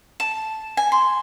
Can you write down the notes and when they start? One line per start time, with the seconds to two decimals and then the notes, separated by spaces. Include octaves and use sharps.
0.20 A5
0.77 G#5
0.92 C6